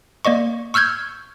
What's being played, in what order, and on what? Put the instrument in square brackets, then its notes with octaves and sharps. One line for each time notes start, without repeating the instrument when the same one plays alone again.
[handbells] A#3 D5 D#5 C#6
C#6 E6 F6 G6 G#6